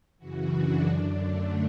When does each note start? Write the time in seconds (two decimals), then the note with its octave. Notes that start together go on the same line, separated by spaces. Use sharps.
0.17 F#2 C#3 E3 F#4
0.52 D4
0.87 F#2 D3
1.21 A3